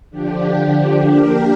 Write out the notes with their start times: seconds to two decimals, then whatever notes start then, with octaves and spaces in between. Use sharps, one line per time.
0.10 D3 F3 D4 G4
1.07 A#3 D4 G4 A#4